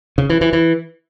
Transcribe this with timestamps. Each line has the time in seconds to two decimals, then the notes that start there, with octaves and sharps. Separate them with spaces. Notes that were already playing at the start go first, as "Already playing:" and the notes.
0.18 C#3
0.30 E3
0.41 E3
0.53 E3